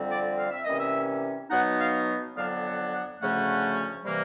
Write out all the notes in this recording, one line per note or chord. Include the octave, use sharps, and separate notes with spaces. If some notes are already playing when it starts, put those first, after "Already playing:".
Already playing: F2 D3 G3 C4
D5
F5
E5
C3 E3 G3 A#3 C#4 D#5
E5
B2 F#3 B3 D#4 F#5
F5
F2 D3 F#3 B3 D4 F5
F#5
F#5
D2 C#3 F3 A3 C#4 F#5
C3 E3 G3 A#3